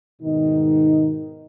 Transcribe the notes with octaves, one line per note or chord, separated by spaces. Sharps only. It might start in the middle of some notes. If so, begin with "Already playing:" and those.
G#2 B2 D#3 D#4